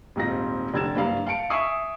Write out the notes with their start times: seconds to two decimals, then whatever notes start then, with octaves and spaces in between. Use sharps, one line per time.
0.16 D#1 G#2 C4 F4 A#6
0.74 F1 D3 G#6 A6 E7
0.95 F#1 G2 F5 A#5
1.26 F5 A5 C#7 D7
1.50 E5 G#5 C#6 D#6 C7